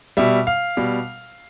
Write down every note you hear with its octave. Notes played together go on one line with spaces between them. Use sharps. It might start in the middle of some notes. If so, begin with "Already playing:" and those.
B2 G3 E5
F5
B2 G3